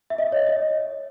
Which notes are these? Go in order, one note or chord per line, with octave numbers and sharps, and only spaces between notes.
E5
D#5
C#5
D#5